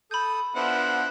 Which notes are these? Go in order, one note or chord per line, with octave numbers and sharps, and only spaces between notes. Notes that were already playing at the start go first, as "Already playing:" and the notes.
A4 B5 D#6 G6
F3 B3 D4 E4 C5 F#5